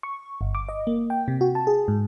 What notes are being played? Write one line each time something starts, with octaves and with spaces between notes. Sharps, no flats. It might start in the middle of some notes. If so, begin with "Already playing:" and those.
C#6
G1
D6
D#5
A#3
G5
C3
F#4
A5
G#4
G#2